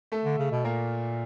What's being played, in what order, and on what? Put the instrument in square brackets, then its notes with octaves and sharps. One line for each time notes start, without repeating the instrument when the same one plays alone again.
[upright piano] A3 A4
[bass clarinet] D3
C#3
B2
[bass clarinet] A#2 [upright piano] A#3 A#4